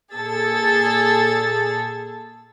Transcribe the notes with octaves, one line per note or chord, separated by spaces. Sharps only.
A#2 G#4 A4 E6 A6